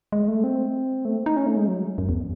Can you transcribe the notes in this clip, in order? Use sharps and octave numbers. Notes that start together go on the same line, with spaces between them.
G#3
A3
C4
A3
D#4
C#4
A3
G#3
F#3
F#2
E2